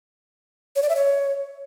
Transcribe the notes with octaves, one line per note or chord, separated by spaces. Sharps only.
C#5
D5
E5
C#5